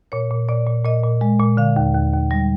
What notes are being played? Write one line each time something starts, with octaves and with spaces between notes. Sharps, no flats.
A#2 C#5
A#2
A#2 D5
A#2
A#2 D#5
A#2
G#3
A#2
D3 F5
D#2
D#2
D#2
G3